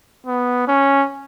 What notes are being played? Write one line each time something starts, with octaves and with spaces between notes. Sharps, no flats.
B3
C#4